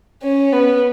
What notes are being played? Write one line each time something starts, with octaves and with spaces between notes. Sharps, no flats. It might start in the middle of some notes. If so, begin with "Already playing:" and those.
C#4
B3